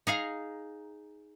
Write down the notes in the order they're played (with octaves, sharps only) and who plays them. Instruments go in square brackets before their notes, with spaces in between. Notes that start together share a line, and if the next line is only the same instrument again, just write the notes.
[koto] D#4 G#4 F5 A#5